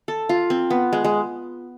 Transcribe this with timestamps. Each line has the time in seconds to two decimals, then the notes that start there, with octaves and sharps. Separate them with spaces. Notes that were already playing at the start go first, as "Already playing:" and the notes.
0.08 A4
0.29 F4
0.50 C4
0.70 B3
0.93 G#3
1.04 G#3